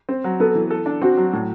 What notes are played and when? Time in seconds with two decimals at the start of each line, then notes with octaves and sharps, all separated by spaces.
0.09 C4
0.24 F#3
0.40 B3 A4
0.55 E3
0.71 A4
0.86 D4
1.02 C4 F#4
1.17 F#3
1.33 A2